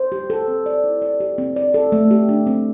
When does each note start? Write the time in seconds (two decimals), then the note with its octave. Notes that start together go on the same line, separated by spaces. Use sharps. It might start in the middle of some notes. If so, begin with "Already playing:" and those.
Already playing: C5
0.12 G4
0.30 A4
0.48 C4
0.66 D5
0.84 E4
1.02 D5
1.20 G4
1.38 C4
1.56 D5
1.74 A4
1.92 A3
2.11 G4
2.29 D4
2.46 C4